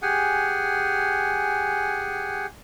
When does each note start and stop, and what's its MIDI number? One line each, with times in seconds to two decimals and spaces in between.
0.02 2.46 67
0.02 2.46 68
0.02 2.46 78
0.02 2.46 80